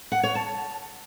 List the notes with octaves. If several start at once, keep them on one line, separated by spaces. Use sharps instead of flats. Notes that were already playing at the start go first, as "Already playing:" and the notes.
F#5
C#5
A5